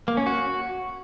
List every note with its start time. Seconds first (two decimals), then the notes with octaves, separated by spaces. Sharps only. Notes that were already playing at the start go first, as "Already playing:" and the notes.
0.08 A#3
0.17 C#4
0.26 F#4